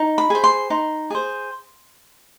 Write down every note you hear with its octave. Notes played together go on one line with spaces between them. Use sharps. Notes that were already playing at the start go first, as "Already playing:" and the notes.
Already playing: D#4
B5
G#4 C5
C6
D#4
G#4 C5